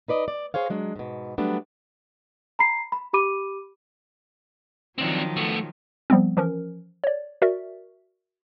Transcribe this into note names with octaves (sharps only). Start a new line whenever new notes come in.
D#4 B4 D5 D#5
D5
G#4 C5 C#5 F5
F#3 G#3 D4
G#2 B2
F#3 G3 A3 B3 D4
A#5 B5 C7
B5
G4 B5 D6 D#7
D#3 F3 F#3 C4 D4
A3 B3
F3 G3 B3 C4
E3 F3 C#4 A#4
C#5 D5
F#4 A#4 D5 E5